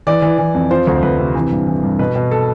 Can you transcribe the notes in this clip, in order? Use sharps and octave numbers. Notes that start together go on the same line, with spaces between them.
E3 D5
E3
E3
F2
F3 C5
D2
D2 B4
C3
E3
G2
E3
G2
B2 B4
B2
A4